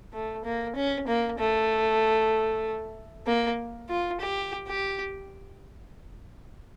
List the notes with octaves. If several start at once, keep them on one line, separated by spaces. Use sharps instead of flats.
A3
A#3
C#4
A#3
A3
A#3
F4
G4
G4